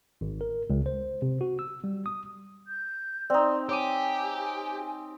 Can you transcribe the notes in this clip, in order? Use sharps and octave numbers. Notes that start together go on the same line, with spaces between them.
G#1
A#4
C#2
C5
C3
F#4
E6
G3
D#6
G6
C4 D#4 D5
G4 C#5 G#5 D6 D#7